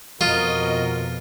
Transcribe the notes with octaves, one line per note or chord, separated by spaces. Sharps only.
F2 B2 F4 F#4 A#4 D#5